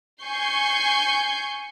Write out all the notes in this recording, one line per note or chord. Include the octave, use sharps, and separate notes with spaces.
G#5 C#6 G6 C7